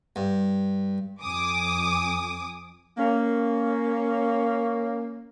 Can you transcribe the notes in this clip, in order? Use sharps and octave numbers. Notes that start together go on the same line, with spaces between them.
G2
F2 G#5 D6 D#6
A#3 C#4